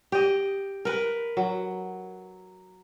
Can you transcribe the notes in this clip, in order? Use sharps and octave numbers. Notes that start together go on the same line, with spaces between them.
G4 D#5
A#4 B4
F#3